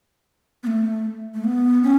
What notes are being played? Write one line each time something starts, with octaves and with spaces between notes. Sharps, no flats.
B3
A3
A3
B3
C#4